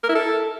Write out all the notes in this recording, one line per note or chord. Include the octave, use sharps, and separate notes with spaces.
A#4
E4
A4